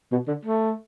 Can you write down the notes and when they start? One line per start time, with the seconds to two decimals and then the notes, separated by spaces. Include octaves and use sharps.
0.12 B2
0.28 D3
0.45 A3